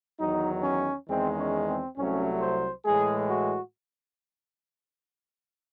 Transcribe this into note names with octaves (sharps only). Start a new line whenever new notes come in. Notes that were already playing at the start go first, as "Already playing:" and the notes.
E2 D#3 F#3 D#4
C#4
E2 D#3 G#3 C4
C#4
C4
C2 C3 F#3 A3 C#4
C5
A2 E3 G#3 G#4
F#4